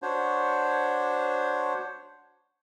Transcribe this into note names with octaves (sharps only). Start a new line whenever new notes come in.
D4 F#4 C5 C#5